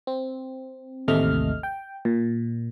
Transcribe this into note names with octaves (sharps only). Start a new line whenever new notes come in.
C4
A1 D#2 C3 A3 D#5 F6
G5
A#2